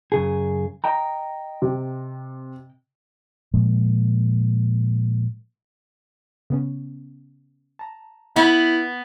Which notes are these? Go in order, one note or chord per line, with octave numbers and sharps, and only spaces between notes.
F#2 C#3 G#4
D#5 G5 A#5
C3
A#2 F3 G#3 A#3
C#3 B3 C#4
A5 A#5
B3 E4